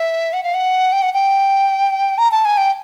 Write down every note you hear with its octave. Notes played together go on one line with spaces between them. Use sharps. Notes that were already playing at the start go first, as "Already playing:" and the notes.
Already playing: E5
F#5
F5
F#5
G5
F#5
G5
A#5
A5
G#5
G5